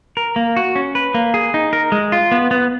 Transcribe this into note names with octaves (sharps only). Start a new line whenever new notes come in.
A#4
A#3
F#4
C#4
B4
A#3
G#4
D#4
A#4
G#3
F4
B3
B3